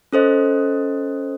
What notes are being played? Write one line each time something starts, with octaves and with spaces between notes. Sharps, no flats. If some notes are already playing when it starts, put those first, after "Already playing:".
C#4 A4 C5 D#5